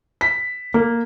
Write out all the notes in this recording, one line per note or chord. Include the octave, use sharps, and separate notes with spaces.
B6
A#3